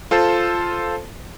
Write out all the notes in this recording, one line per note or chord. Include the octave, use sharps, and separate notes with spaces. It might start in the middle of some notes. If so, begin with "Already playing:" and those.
F4 A4 C5 A5